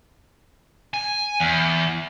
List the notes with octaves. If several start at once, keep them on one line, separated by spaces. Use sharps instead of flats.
G#5
E2